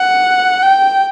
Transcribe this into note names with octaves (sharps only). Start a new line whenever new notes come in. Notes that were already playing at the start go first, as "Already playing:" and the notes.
Already playing: F#5
G5